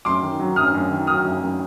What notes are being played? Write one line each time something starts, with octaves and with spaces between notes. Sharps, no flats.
F#2 C6 D6
D#3
F#3
F#2 D#6 F6
F#2
D#3
F#3 D#6 F6
F#2
F#2